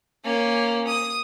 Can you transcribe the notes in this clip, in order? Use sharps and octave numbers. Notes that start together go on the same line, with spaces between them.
A#3 C#4
D#6